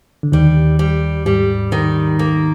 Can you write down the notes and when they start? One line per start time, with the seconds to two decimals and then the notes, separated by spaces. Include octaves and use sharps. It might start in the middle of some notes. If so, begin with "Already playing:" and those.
0.23 D3
0.32 D#2 D#3 G3
0.79 G3
1.26 G#2 G3
1.72 D#3
2.19 A#3